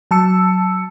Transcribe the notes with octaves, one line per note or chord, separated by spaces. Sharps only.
F#3 A5 E6 C#7